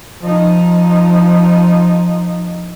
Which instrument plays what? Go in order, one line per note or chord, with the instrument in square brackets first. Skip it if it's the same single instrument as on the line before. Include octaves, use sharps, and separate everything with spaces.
[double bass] F3 D#4